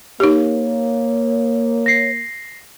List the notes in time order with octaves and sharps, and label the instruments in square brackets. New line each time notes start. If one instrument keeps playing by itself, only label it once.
[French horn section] A#3 [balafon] D#4 G4 [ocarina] C#5
[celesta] A#6 C7